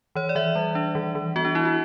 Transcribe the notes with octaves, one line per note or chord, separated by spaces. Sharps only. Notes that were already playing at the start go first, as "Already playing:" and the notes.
E3 C#5
D5
E3 E5
G3
D4
E3
E3
B3 F#4
D4
D4 E4
F#4